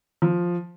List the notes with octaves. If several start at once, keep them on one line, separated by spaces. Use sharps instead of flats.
F3